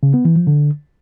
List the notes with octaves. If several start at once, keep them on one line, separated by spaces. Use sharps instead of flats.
C#3
B3
E3
F3
D3